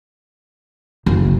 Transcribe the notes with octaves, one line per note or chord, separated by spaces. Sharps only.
F#1